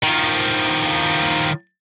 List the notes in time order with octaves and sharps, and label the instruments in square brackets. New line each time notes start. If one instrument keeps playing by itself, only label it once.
[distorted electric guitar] D#3 F3